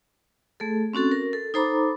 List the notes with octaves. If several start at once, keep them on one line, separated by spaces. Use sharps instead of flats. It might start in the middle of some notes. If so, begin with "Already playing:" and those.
A3 G#4 A4
C4 C#4 F#4 A4
A#4
A4
D#4 A4 C5 A#5 B5 D6